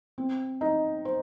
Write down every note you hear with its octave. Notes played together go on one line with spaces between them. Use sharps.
C4
D#4
C5